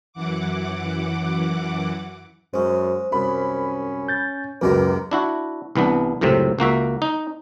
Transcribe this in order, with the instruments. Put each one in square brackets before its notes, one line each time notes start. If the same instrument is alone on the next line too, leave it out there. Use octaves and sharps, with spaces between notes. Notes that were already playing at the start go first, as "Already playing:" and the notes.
[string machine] F#2 E3 F#5 D6
[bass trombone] F#2 [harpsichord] G#3 C#4 [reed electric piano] C5
[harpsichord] C2 F#2 [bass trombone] C#4 [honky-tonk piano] B5
[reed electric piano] G6 A6
[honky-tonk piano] C#2 F#2 F#3 [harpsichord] A#3 G4 A#4 [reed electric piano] B4
[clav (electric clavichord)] D4 E4 F#4
C2 E3 B3 D4
C#2 F#2 A2 C3 C4
C#2 A#3 F#4 E5
D#4